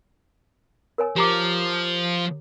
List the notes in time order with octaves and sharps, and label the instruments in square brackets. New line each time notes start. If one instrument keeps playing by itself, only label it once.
[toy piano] A#4 C#5 G#5
[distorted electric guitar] F3 [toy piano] G4 A#5 D6